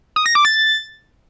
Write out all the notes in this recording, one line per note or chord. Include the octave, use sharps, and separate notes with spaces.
D#6
A#6
D6
A6